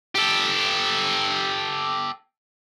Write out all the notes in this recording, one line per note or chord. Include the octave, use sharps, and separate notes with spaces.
G4 A4